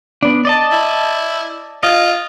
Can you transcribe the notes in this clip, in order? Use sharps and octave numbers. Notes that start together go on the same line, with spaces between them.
B3 D4
D5 D#5 A5
E4
F4 D#5